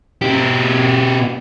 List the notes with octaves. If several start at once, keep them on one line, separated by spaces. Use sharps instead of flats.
B2 G4